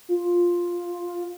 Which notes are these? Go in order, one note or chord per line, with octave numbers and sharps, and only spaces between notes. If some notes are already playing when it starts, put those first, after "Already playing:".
F4